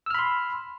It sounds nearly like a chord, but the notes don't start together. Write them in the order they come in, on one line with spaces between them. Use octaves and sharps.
E6 F6 B5 C6